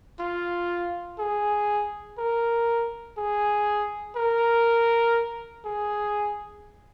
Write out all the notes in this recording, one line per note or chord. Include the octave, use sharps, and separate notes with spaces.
F4
G#4
A#4
G#4
A#4
G#4